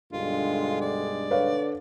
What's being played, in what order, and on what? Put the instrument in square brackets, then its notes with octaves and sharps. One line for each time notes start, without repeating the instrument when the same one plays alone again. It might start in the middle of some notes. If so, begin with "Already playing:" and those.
[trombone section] B1 G2 G#3 [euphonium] D3 [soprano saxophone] F4
[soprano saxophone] D5
[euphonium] D3 [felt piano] B4 C#5 F5